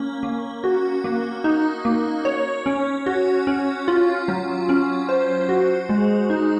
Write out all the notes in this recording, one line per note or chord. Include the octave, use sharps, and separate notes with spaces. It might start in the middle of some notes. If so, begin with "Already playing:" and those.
Already playing: A#3 C#4
A#3
F#4
A#3
D#4
A#3
C#5
C#4
F#4
C#4
F4
F#3
C#4
C5
F#4
G#3
D#4